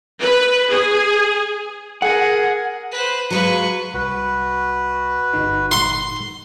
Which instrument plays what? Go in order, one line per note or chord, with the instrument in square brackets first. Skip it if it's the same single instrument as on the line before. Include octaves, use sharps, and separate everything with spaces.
[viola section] B4
G#4
[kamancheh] G#4 A#4 [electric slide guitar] F#5
[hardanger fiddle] B4 C5
[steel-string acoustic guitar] F#3 G#3 F4 [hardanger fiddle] B4 C#6
[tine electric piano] C2 [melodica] F#4 B4
[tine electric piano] G1 D#4
[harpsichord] C6